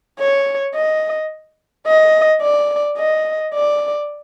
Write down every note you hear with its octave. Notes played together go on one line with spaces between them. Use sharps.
C#5
D#5
D#5
D5
D#5
D5